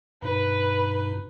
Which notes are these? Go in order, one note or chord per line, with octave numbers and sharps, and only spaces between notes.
G2 B2 D#4 B4